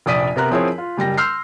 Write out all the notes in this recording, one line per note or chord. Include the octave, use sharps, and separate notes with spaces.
F1 A#1 D5 D#6 B6 D#7
C3 B3 A#4 A#5 F#6
F3 C4 E4 G#4 A#4 C#5
F4
F#1 G3 G5 A#6
C6 E6 F6 G6 C7